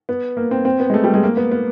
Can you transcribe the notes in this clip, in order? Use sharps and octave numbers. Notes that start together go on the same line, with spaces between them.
B3
A#3
C4
C4
B3
G#3
A3
G3
G#3
A#3
B3
B3